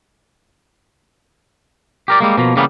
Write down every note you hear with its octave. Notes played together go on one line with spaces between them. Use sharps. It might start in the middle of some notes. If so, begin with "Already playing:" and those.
G4 A#4 D5
G3 G#3 A#3
B2 F3 A#3
C#3 E3 G3 A#3 B3